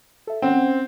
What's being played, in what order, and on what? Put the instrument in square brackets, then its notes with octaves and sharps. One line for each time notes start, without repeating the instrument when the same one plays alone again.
[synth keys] A4 E5
[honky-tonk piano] C4 [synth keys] C#4 C5 F#5